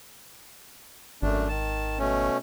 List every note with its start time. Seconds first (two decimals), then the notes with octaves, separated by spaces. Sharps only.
1.22 G#1 F#2 A3 D4
1.48 D#3 A5
1.98 B2 A3 C#4